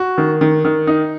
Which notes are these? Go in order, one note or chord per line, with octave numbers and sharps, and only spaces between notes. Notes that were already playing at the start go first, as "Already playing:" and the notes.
Already playing: F#4
D#3
D#3
D#3
D#4